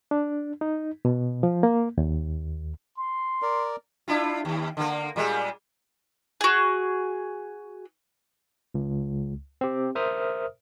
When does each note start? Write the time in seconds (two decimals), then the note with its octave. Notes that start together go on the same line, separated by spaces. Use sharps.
0.11 D4
0.61 D#4
1.05 B2
1.43 F3
1.63 A#3
1.98 D#2
2.97 C6
3.42 A#4 D5
4.08 D4 E4 F4
4.45 D#2
4.77 D3 A#3
5.16 A#2 G3 G#3
6.41 F#4 G#4
8.74 C#2
9.61 C4 G4
9.95 A#4 C5 E5 D#6 F6